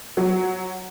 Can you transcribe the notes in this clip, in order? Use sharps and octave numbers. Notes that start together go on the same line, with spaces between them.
F#3